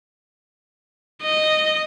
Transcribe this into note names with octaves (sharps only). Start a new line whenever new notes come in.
D#5